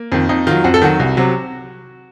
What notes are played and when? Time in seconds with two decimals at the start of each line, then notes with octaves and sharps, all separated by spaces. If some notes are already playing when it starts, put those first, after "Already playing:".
Already playing: A#3
0.12 F2 D#3
0.29 F2 D#4
0.47 D#3 F#3 F4
0.64 F2 F#4
0.74 A4
0.82 D#3 F#3 F#4
1.00 C2
1.17 C3 F#3